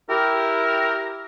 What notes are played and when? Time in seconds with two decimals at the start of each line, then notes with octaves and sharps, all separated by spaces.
0.10 E4 G4 A#4